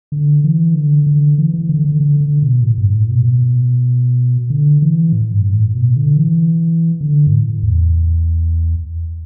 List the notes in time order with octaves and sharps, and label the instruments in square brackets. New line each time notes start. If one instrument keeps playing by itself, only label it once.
[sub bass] D3
E3
D3
D3
E3
E3
D3
D3
D3
D3
B2
A2
G2
A2
B2
B2
D3
E3
A2
G2
A2
B2
D3
E3
D3
G2
A2
E2